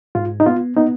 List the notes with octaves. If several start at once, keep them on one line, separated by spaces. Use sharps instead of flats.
G#2 F4
D#4
B3 F4
B3 D#4